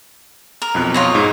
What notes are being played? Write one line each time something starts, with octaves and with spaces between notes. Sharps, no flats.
A#4
B1 F2 F#6
F4 C#5 D#5
G#2